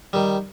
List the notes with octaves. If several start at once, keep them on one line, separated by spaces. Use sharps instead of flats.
D#3 G3